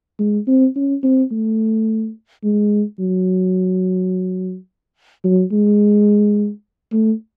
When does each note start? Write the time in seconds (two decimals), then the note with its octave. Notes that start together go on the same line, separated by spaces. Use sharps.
0.19 G#3
0.48 C4
0.76 C#4
1.03 C4
1.32 A3
2.44 G#3
3.00 F#3
5.24 F#3
5.52 G#3
6.92 A3